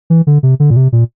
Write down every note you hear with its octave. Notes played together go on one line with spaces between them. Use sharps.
E3
D3
C3
D3
A#2
C3
A#2